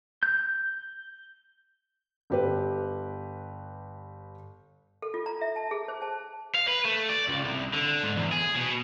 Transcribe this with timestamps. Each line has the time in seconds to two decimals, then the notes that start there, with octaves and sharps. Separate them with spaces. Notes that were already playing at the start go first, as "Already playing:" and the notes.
0.23 G6
2.30 G1 G4 B4
5.02 A4
5.14 F4
5.26 A#5
5.41 E5
5.56 A5
5.71 G#4
5.88 C5
6.02 A5
6.55 F5
6.68 B4
6.85 A3
7.09 D5
7.28 C#2
7.44 C2
7.73 D3
8.03 G#2
8.16 E2
8.32 G#4
8.55 B2